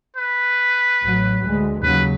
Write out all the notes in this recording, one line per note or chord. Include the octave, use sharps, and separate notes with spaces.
B4
A1 F#3
D2 G#3
D#2 C#3 F#3 B4